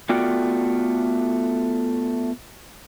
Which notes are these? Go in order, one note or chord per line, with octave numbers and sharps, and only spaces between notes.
A3 B3 F4 F#4 D5 G5